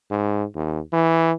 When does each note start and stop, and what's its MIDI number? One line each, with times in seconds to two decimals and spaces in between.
0.11 0.45 44
0.56 0.80 39
0.93 1.33 52